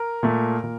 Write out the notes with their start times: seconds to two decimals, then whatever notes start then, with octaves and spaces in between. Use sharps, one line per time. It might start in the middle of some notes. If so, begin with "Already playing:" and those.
Already playing: A#4
0.23 A#2 A3
0.64 A#2